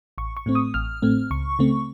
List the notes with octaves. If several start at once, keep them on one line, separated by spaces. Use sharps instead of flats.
A1 C#6
C#6
A2 A3 C4
D#6
A1 F6
A2 A3 C4
C#2 C#6
C#3 A3 C4